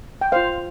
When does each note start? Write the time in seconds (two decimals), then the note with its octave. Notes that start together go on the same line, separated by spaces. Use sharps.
0.21 G5
0.32 F4 C5 F5